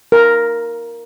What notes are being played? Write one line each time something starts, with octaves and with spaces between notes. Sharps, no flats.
A#4